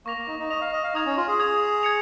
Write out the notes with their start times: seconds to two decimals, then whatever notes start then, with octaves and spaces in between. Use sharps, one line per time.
0.06 A#3 C#6 A#6 F7
0.17 A#3
0.27 D#4
0.39 D#4
0.50 D#5 C#6 A#6 F7
0.61 F5
0.73 D#5
0.84 F5
0.94 D#4 D#6 G#6 F7
1.06 C#4
1.17 F4
1.28 G#4
1.40 D#6 G#6 F7
1.83 G#6 C#7 F7